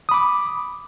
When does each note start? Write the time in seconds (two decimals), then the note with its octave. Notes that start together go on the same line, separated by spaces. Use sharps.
0.09 D#6
0.11 B5
0.14 D6